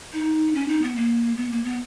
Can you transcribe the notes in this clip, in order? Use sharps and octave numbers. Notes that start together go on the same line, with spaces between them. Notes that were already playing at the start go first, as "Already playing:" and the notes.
D#4
C#4
D#4
B3
A#3
B3
A#3
B3